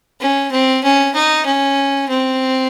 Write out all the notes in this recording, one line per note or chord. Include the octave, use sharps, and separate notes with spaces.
C#4
C4
C#4
D#4
C#4
C4